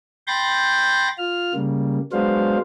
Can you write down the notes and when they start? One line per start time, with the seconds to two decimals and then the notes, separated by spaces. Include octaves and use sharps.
0.27 G5 B5 C6 G6 A6 A#6
1.18 F4 F6
1.54 C#3 G3 A#3
2.12 F#3 G#3 B3 D4 C5 F5